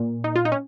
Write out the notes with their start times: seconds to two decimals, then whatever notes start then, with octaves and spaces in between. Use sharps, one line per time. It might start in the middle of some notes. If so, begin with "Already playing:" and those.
Already playing: A#2
0.24 D#4
0.36 F4
0.45 D#4
0.52 C#4